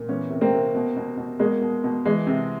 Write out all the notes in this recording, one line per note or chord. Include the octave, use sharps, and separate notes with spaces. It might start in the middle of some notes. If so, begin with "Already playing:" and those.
Already playing: A#2
E3 B3 C#4
C3
A#3 C4
C3
B2
B2
B2
B2 G#3 A#3
B2
B2
E3 G#3
C3